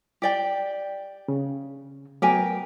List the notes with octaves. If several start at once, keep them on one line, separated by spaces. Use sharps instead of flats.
G4 D5 G5
C#3
F#3 A3 B3 G4 A#4 G#5